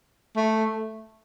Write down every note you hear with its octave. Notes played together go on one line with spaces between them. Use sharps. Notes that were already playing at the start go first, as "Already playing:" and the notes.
A3